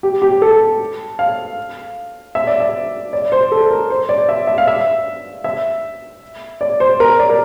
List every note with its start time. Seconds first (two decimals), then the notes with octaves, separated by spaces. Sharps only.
0.03 G4
0.22 G4
0.42 A4
1.19 F5
2.35 E5
2.47 D5
2.60 E5
3.13 D5
3.32 C5
3.52 A4
3.71 A#4
3.90 C5
4.09 D5
4.29 E5
4.47 E5
4.58 F5
4.68 E5
5.44 E5
6.61 D5
6.80 C5
7.00 A#4
7.19 D5
7.30 A#4